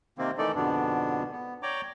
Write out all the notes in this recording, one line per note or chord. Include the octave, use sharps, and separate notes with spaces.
C3 D#3 A#3 C4
D#3 E3 A3 D#4 A4 D5
F2 G#2 B2 D3 B3 D4
B3
C#5 D5 G5 A#5 D6